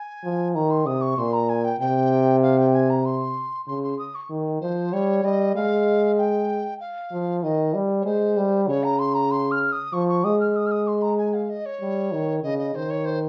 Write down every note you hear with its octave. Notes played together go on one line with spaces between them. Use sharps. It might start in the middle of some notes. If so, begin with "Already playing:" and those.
Already playing: G#5
F3
D#3 A#5
C6
C3 D#6
C#6
A#2 C6
A#5
G#5
G5
C3 G5
F5
G5
G#5
A#5
C6
C#3 C6
C6
D#6
C#6
D#3
F3 C5
G3 C#5
G3 D#5
G#3 F5
G5
F5
F3
D#3 D#5
G3
C#5
G#3 C5
G3
C#3 C#5
A#5
C6
A#5
C6
F6
D#6
F3 C#6
C#6
G#3 D#6
F6
D#6
F6
D#6
C6
A#5
G#5
F5
D#5
C#5
G3
D#3
C#3 D#5
D#5
D#3 C5
C#5
C5